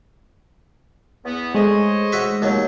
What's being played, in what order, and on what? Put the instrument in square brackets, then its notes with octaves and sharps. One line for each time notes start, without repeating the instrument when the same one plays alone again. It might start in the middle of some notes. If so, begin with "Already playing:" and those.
[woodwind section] E2 B3
[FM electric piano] G#3 A3 D#4 [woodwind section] C5 C#5 D#5
[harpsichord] F#4 E5
D#2 F#3